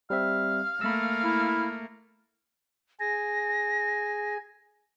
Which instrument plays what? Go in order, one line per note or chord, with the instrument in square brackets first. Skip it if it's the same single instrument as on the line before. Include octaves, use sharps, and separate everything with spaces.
[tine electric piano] G3 C4 E5 [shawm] F5
[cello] A3 A#3 [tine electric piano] B5 E6
[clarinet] E4
[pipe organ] G#4 G#5 [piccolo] A#6